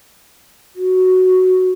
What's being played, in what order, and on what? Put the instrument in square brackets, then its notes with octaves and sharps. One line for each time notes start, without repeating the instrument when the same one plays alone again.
[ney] F#4